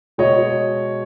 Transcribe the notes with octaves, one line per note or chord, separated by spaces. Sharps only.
B2 G#3 C#5 D#5